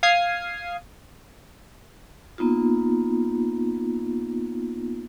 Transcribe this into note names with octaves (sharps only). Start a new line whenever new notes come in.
F5 D#6 F6 G#6 C7
A#3 B3 D#4 F4